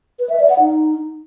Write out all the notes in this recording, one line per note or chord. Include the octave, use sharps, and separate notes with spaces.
B4
E5
D5
F#5
D#4